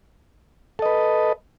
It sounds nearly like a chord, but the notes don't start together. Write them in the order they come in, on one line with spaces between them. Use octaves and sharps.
A4 D#5 B4